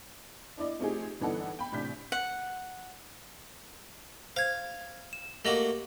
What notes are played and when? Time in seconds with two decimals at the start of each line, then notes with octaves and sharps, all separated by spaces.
0.58 D4 E4 D5 D#5
0.79 F3 A3 C4 D#4 G4 G#4
1.21 G1 E3 D4 D#4 A4 F#5
1.59 G5 B5
1.72 A1 C3 D4 G6 B6
2.12 F#5
4.36 C5 F5 G#6
5.13 E7
5.45 A3 A#3 F#4 G4 D#5 F#7